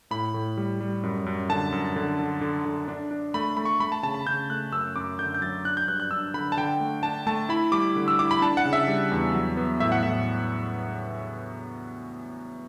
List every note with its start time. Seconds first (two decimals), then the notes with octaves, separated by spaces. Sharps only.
0.11 A2 B5
0.34 A2
0.57 G3
0.81 G3
1.03 F#2
1.26 F#2
1.49 D3 A5
1.72 F#2
1.96 D3
2.19 D3
2.41 D3
2.66 D3
2.88 D4
3.11 D4
3.34 A3 B5
3.57 A3 B5
3.65 C#6
3.80 A3 B5
3.92 A5
4.03 C#3 A5
4.14 B5
4.26 C#3 G6
4.50 A3 F#6
4.72 F#2 E6
4.96 F#2 D6
5.19 D3 G6
5.34 G6
5.42 F#3 A6
5.65 D4 F#6
5.77 G6
5.88 G2 F#6
6.00 F#6
6.11 D4 E6
6.34 D3 B5
6.52 A5
6.57 D3 G5
6.80 A3
7.03 D4 A5
7.27 A3 A5
7.49 E4 B5
7.72 G3 D6
7.96 D3
8.08 E6
8.19 E4 D6
8.31 B5
8.42 D4 A5
8.57 F#5
8.65 C#3
8.73 E5
8.88 G3
9.12 E2
9.35 F#3
9.57 B3
9.80 A2 E5
9.92 F#5
10.03 A2 E5